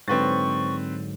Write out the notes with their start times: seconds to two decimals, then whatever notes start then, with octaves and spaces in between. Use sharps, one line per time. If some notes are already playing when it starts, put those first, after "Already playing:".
0.08 G#2 D3 F#3 C4 B4 C#6 A6